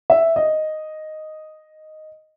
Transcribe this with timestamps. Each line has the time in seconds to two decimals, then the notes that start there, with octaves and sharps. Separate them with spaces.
0.10 E5
0.36 D#5